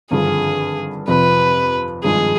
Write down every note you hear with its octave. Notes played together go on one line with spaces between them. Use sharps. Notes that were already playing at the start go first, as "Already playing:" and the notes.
G#1 G2 D3 F3 C4 G#4
F2 C3 F3 C4 B4
G#1 G2 F3 G#3 G#4